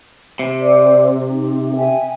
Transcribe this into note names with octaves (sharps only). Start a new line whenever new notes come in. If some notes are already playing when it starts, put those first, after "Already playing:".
C3
C5 D5 D6
D#4
E5 G5 G#5